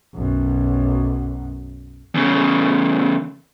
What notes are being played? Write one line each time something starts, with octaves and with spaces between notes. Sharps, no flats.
B1 F#2
E2 C#3